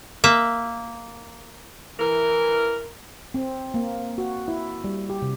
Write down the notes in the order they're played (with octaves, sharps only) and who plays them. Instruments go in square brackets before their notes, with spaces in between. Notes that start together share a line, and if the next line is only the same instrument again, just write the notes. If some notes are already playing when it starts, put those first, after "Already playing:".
[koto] A#3 E5
[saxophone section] E3 A#4
[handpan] C4
A#3
F#4
E4
G3
G4
C3